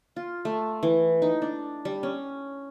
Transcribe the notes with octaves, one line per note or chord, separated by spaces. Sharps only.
F4
A3
E3
D#4
D4
G3
C#4